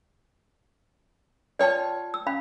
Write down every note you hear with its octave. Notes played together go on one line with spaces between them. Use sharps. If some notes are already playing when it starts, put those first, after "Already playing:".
F4 C#5 D5 G5 A5
E6
C#4 F5 B5